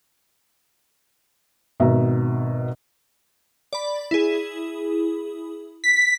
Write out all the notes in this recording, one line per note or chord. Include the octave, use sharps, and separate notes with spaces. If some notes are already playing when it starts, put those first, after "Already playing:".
G#1 B2 E5 A#5
D5 B5
E4 G#4
B6